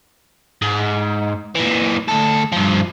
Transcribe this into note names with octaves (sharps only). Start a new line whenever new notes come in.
G#2
A#2 E3
D2 A4
G2 F3